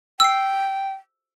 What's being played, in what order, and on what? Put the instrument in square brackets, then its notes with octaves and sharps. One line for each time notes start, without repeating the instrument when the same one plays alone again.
[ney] G5 [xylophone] E6 C7